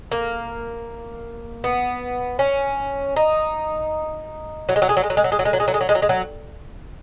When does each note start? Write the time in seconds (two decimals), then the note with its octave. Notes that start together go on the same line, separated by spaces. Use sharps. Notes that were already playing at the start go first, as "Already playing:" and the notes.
0.12 A#3
1.64 B3
2.39 C#4
3.16 D#4
4.69 F#3
4.76 G#3
4.82 F#3
4.89 G#3
4.97 F#3
5.04 G#3
5.10 F#3
5.17 G#3
5.24 F#3
5.32 G#3
5.39 F#3
5.45 G#3
5.53 F#3
5.60 G#3
5.68 F#3
5.74 G#3
5.81 F#3
5.89 G#3
5.95 F#3
6.02 G#3
6.09 F#3